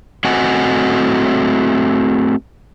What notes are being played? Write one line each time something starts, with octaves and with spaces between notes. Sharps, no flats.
A3 C4 F#4 D#5 F#5 G#5